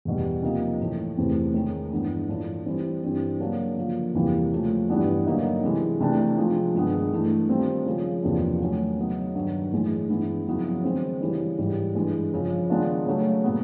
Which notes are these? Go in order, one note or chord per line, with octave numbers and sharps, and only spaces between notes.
E2 B2 G3
C3 F3 A#3 D#4
A2 E3 A3
E2 C3 E3 A3 C4
D#3 G#3 C#4
G2 E3 G#3 B3
A2 E3 A3 D4 F4
E3 G3 C4
G2 E3 G3 C4
C#3 F#3 A#3 D4
D3 F3 A#3
E2 C3 E3 G3 A#3
C#3 F3 A3
G2 E3 G3 B3 D4
D3 F#3 A#3 D#4
C3 E3 G#3
C3 E3 A3 D4
C3 F3 G#3
G2 D#3 G#3 B3
G2 E3 A3
D#3 G3 C4 F4
C#3 F3 G#3
E2 C3 F3 A#3 D4
D#3 F#3 A3 C#4
C#3 F#3 B3 D#4
G2 D#3 F#3
A2 E3 G#3
G2 E3 G#3 B3 E4
F2 C#3 F#3 B3 E4
D#3 G#3 C4
C#3 E3 G3
G#2 E3 G3
G2 E3 G#3
F2 C#3 F3
D#3 G#3 B3 D4 F4
C#3 F#3 A3
A#2 F#3 B3